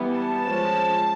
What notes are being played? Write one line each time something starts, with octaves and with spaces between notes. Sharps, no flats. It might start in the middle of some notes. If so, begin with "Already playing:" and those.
Already playing: E3 G3 B3
A5
F3 G#3 C#4